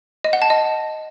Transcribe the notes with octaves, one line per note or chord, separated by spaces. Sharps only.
D#5
F#5
A5
D#5